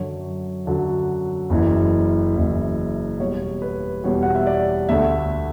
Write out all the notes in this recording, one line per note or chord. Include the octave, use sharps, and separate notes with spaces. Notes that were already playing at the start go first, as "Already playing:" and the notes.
Already playing: F#2 D3 F#3 C#5
F#2 D3 F#3
F#1 F#2 E3
F#1 F#2 E3
E2 B2 G3 C#5
B4
E2 B2 G3 C#5
F#5
E5
D5
D2 D3 A3 E5